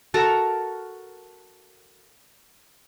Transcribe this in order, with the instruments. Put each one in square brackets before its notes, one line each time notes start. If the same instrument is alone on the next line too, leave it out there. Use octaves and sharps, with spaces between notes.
[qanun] F#4 A4 A#4 A#5